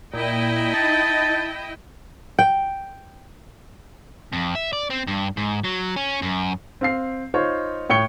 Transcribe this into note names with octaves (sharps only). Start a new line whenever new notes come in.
A#2 E4 D#5 G5
D#4 A5
G5
F2
E5
D5
C4
G2
G#2
F#3
C#4
F#2
C4 F5 C7
D#4 F4 C5 C#5
A2 C#5 G5 C#7 G7